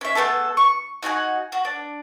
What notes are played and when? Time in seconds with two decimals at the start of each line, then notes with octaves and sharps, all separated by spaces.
0.01 C#4 E5
0.15 A3 B3 G#4 A4
0.57 C#6
1.03 D#4 F#4 F#5 G#5
1.52 F#4
1.65 D4